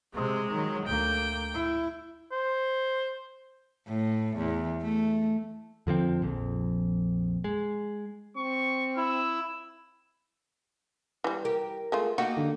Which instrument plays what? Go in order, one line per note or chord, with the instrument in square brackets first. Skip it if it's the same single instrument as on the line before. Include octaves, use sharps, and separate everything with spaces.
[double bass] C3 C4 [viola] G#3
[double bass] D#3 F#3
[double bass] D2 A#3 [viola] G5
[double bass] E4
[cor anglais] C5
[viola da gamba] A2
E2
A3
[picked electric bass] F2 D3 F3 C4
A#1 F2
G#3
[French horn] C4 [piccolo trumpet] C#6
[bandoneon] E4 [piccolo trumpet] E6
[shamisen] E3 G3
[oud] G4 [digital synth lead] A#4
[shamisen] G#3 A3 F4
[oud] A#3 D#4 G4 [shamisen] F#4
[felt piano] D3